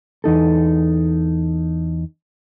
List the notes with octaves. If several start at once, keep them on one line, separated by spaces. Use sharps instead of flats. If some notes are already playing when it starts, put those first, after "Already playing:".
E2 D#4 A4